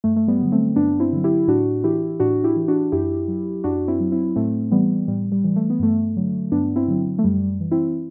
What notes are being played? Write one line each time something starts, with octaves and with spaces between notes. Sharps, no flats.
G2 A3
A3
G3 B3
D3 F#3
A3 C4
G2 B3 D4
C4 E4
D3 F#3
E4 G4
A2 D4 F#4
E3 E4 G4
A2 D4 F#4
E4 G4
E3
D4 F#4
F#2 E4 G4
F#3
F#2 D4 F#4
C4 E4
F#3
C4 E4
A2 A3 C4
E3 G3 B3
A2 G3
G3
E3
A3
B3
G2 A3
D3 F#3
G2 B3 D4
C4 E4
D3 F#3
A3
F#2 G3
E3
C4 E4